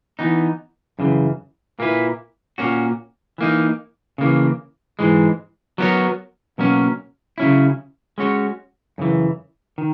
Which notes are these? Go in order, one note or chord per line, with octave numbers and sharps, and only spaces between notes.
E3 B3 D#4
F#2 C#3 E3
A#2 A#3 E4 B4
A#2 A#3 C#4 F#4
E3 A#3 D#4
C#3 E3 A#3
G#2 E3 G#3
F#3 B3 E4 A#4 C#5
B2 F#3 A#3 C#4
C#3 F#3 C#4 E4
G#3 C#4 F#4 C#5
F#2 C#3 E3
D#3